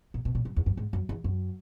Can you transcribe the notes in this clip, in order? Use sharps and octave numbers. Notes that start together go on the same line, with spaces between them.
A#2
B2
A#2
F#2
E2
F#2
G#2
F#2
E2
F#2